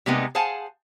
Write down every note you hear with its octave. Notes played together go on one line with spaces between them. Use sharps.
C3 G3 G#3 A#3 B3 D#4
G#4 C5 F5 F#5 G#5 A5